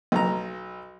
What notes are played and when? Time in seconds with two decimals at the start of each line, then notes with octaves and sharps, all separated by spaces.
0.12 B1 A#5